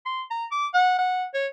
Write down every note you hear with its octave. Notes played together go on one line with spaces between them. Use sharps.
C6
A#5
D6
F#5
F#5
C#5